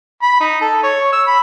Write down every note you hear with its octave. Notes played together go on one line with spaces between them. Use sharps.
B5
D#4
A4
C#5
E6
B5